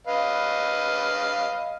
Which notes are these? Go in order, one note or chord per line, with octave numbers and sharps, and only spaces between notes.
B4 D#5 F5